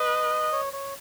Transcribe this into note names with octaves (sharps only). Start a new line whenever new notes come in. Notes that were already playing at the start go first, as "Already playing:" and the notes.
Already playing: B4 D#5
C#5
C#5